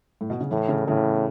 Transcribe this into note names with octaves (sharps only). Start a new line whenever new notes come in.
A2
B2
C#3
A2 E3
C#3
A2 C#3